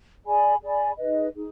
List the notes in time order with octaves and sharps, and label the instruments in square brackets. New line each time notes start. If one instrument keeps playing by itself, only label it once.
[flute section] G#4 D5 G#5 B5
G#4 D5 G#5 B5
D#4 G#4 B4 D#5
D#4 G#4